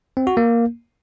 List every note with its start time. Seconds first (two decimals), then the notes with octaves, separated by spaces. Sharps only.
0.17 C4
0.27 F#4
0.37 A#3